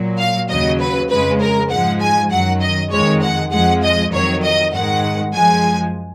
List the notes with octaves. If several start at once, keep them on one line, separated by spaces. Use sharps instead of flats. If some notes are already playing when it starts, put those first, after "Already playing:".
Already playing: A#2 F#3
F5
D#2 C#3 F#3 D#5
B4
F2 C#3 G#3 B4
A#4
G#2 F3 G#3 F#5
G#5
F#2 D#3 F#3 F#5
D#5
F2 D#3 G#3 C#5
F#5
F2 F3 G#3 F#5
D#5
F2 D#3 F#3 C#5
D#5
G#2 D#3 G#3 F#5
F#2 F3 G#3 G#5